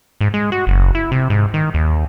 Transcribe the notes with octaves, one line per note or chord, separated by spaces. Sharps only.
G#2
G#3
F#4
F#1
E4
C3
G#2
D#3
D#2